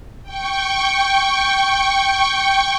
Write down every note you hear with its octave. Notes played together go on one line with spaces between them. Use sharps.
G5 C#6